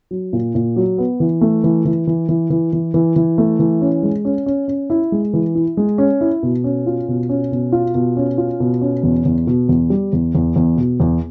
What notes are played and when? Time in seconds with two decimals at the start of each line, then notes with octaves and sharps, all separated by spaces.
0.11 F#3
0.33 A#2
0.55 A#2
0.76 F#3
0.98 B3
1.20 E3
1.41 A3
1.64 E3
1.85 E3
2.07 E3
2.29 E3
2.50 E3
2.73 E3
2.94 E3
3.16 E3
3.38 A3
3.59 E3
3.81 C#4
4.03 G#3
4.25 C#4
4.46 C#4
4.68 C#4
4.90 E4
5.12 G#3
5.33 E3
5.55 E4
5.77 G#3
5.98 C#4
6.21 E4
6.43 B2
6.64 C#4
6.86 F4
7.08 B2
7.29 C#4
7.52 B2
7.72 F4
7.95 B2
8.17 C#4
8.38 F4
8.60 B2
8.82 C#4
9.03 E2
9.25 E2
9.47 B2
9.69 E2
9.90 G3
10.13 E2
10.35 E2
10.56 E2
10.77 B2
11.00 E2